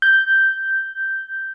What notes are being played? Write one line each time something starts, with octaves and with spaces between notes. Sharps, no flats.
G6